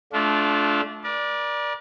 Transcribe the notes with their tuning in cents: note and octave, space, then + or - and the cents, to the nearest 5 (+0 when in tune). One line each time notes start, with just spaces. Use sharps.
A3 -30 D4 -20 F4 +0
A#4 +45 D5 +0